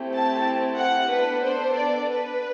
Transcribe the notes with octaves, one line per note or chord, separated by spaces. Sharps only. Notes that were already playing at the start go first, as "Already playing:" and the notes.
Already playing: A3 C4 E4 G4
A5
F#5
B3 D4 A4 B4
C5
D5
B4